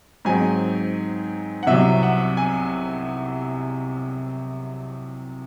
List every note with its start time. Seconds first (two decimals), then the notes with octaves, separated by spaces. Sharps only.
0.25 G#2 F#3 C4 D#4 G#5
1.63 F#5
1.67 C2 C3 F#3 E5
2.03 F#5
2.37 G#5